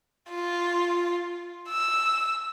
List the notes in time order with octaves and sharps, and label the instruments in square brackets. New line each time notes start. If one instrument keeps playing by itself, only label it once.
[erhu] F4
E6